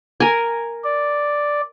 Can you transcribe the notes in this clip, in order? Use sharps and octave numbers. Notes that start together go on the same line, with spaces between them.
A#4 G#5
D5